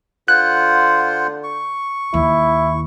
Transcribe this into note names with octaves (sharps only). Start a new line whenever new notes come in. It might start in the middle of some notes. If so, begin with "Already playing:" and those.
D3 F4 C5 F#5 F#6
C#6
D#2 E4